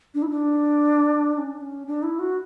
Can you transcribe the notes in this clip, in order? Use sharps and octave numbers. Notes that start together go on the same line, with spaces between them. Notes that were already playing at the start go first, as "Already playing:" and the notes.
D4
E4
D4
C#4
D4
C#4
D4
E4
F#4